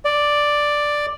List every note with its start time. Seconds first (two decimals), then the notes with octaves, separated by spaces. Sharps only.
0.05 D5